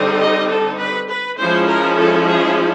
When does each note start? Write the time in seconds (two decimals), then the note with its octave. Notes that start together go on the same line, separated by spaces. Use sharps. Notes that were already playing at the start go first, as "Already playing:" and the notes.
Already playing: D3 G3 C4 D#4
0.20 D#5
0.49 A4
0.79 B4
1.09 B4
1.38 F3 G#3 C#4 E4 C5
1.67 A#4
1.97 A4
2.27 G#4